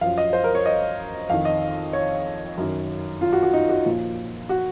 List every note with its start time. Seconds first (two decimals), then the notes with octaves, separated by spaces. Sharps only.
0.01 F#2 F3 F5
0.18 D#5
0.33 C5
0.44 A#4
0.55 C#5
0.66 D#5
1.29 F2 D#3 F5
1.45 D#5
1.93 C#5
2.57 F#2 D#3
3.21 F4
3.33 F#4
3.43 F#4
3.53 D#4
3.69 F#4
3.85 A#2 F3
4.49 F#4